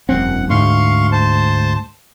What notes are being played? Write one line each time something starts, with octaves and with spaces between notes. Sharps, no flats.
E1 F#2 C4 F#5
D2 G#2 F5 C6 C#6
C5 A5